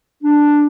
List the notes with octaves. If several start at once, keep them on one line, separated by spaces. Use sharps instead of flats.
D4